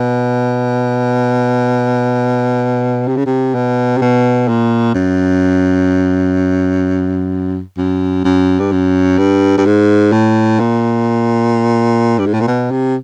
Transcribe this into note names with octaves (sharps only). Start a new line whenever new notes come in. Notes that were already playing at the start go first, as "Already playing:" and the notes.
Already playing: B2
C3
C#3
C3
B2
C3
B2
A#2
F#2
F#2
F#2
G2
F#2
G2
G2
G#2
A2
A#2
G2
G#2
A2
A#2
B2
C3